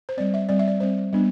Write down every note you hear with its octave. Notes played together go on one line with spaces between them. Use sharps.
C5
G3 C4 D5
E5
G3 C4 D5
E5
D5
G3 C4 C5
G3 B3 D4